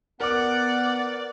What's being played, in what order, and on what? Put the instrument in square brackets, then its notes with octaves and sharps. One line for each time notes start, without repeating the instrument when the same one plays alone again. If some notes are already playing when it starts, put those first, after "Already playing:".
[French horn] B3 [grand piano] A#4 D6 [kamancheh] D5 [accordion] F#5